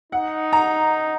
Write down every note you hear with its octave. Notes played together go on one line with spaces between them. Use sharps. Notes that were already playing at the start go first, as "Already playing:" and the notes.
D#4 F#5
A#5